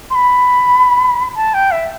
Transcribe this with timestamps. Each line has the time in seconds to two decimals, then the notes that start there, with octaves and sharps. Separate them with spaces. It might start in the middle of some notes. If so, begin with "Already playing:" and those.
0.10 C6
0.15 B5
1.36 A5
1.54 G5
1.71 E5